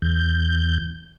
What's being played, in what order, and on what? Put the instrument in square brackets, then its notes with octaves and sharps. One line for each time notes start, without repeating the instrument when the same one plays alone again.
[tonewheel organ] E2 G6